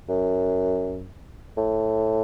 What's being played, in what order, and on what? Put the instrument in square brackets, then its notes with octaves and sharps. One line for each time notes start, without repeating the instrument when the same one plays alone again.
[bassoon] F#2
A2